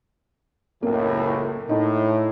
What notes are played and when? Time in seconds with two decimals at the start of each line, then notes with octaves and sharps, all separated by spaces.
0.83 F#1 C#2 A2 A#3
1.69 A2 D#4